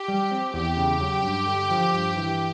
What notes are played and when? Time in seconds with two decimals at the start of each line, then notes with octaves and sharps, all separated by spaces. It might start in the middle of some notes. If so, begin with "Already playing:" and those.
Already playing: G4
0.08 G3
0.31 C4
0.54 E2 G4
0.77 C#3
1.01 F#3
1.24 G2
1.46 D3
1.71 F3
1.94 G2
2.17 E3